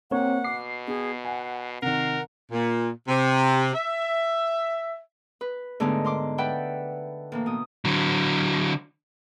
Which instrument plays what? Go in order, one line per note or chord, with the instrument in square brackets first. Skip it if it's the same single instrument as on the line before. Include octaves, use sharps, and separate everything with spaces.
[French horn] C3 [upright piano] A#3 [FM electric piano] C4 C#5 [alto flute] F#5
[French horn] B2 [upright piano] D6 [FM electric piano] C7
[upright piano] B3 [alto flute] G#4
[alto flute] F#5 [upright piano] G#5
[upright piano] C3 D#3 [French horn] A#4 [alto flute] F#5
[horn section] A#2
C3
E5
[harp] B4
G#2 D3 A3 B3 D4 D#4
A#4 C6 D6
B4 D5 E5 F#5 G5 B5
A2 E3 A#3
B2 D#6
[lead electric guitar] D3 F#3